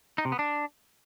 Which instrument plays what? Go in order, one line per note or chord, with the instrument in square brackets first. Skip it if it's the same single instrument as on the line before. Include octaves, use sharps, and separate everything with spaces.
[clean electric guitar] D#4
C3
B3
D4